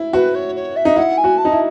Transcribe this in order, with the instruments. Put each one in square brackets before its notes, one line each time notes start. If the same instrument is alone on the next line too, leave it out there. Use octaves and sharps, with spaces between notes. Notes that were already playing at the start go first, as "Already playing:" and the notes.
Already playing: [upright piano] E4
[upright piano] F#4 [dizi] B4
[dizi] C#5
C#5
E5
[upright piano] D#4
[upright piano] E4 [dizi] F#5
[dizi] G#5
[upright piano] F#4
[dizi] A5
[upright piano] D#4
E4